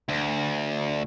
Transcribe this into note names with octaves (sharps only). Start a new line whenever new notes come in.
D2